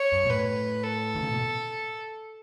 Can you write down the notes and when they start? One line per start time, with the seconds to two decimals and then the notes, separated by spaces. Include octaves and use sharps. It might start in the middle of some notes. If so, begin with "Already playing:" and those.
Already playing: C#5
0.13 F#2
0.24 B2
0.30 A2 B4
0.84 A4
1.15 D#3
1.22 C#3
1.31 B2